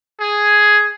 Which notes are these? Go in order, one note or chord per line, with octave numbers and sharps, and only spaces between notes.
G#4